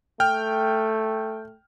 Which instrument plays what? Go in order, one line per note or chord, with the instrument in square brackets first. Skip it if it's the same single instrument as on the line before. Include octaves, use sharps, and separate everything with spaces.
[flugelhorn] A3 [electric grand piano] G5 F6